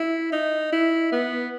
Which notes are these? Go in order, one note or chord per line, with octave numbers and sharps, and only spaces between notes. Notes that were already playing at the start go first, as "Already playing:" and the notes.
Already playing: E4
D#4
E4
B3